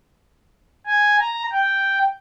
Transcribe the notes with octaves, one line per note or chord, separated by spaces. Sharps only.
G#5
A#5
G5